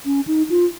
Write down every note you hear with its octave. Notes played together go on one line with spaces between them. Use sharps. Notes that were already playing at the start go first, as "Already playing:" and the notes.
C#4
D#4
F4